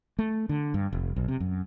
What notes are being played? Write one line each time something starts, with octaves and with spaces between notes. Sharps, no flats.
A3
D3
G2
F1
B1
C3
F#2